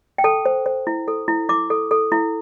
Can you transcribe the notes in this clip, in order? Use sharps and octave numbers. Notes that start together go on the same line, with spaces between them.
G5
A4 A5
C5
C5
E4
A4
E4
E4 D6
A4
A4
E4